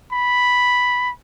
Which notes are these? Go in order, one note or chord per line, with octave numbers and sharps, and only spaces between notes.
B5